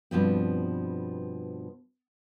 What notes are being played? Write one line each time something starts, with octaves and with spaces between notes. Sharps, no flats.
G2 B2 F3 C4